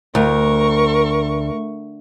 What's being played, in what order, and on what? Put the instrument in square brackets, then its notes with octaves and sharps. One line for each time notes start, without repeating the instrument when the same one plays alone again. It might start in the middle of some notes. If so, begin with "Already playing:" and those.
[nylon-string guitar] D2 [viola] A#4 C#6